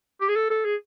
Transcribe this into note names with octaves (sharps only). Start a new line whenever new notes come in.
G4
G#4
A4
A4
G#4